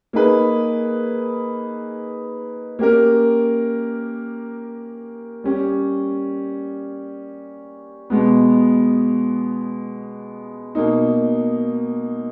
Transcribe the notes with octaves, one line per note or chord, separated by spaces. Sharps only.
A#3 D#4 G#4 B4
A#3 C#4 G4 A#4
G3 C#4 G4
B2 G#3 B3
B2 A#3 D#4